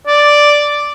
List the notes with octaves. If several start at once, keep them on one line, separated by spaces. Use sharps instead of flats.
D5